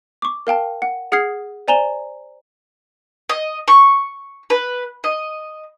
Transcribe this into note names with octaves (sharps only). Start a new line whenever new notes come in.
C#6 D6
A#4 F5 G5 A5
F#5
G#4 F#5 D#6 F6 G#6 C7
C5 D5 G#5 A#5 E7 G7
D#5
C#6
B4
D#5